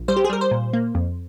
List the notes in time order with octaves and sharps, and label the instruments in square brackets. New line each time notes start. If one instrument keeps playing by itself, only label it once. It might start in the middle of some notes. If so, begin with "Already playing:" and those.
Already playing: [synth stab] A#1
G3 C5
G4
G#4
G3 A#4
C5
A#2
A#3
F2